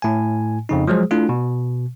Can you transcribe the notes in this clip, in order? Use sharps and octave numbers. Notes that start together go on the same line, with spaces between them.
A2 G#5
F2 C#3 D#4
F3 F#3 G#3 G#4 C5
A3 D4 E4 F4
B2